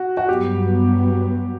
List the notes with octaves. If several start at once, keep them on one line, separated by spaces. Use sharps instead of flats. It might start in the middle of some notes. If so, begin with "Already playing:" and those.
Already playing: F#4
F#4
G2 F#3 B3 G4